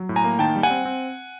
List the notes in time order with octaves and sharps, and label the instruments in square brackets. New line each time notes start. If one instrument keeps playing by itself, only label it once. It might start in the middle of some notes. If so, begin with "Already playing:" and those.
Already playing: [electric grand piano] F#3
A2
G#5 A#5
A#3
D#3 G5 A5
G3
F#5 G#5
C4
C4